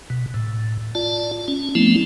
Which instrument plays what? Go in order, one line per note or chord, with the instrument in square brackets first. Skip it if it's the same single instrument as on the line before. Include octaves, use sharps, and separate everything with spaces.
[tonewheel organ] B2
A2
F4 D5 A5
C#4
F3 A3 B3 C4 E4